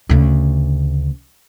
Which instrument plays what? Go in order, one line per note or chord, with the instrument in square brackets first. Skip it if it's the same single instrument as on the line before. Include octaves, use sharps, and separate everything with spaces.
[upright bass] D2 C#3